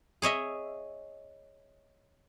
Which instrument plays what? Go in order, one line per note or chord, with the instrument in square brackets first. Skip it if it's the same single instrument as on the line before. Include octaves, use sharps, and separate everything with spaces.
[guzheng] G#4 C#5 D#5 E5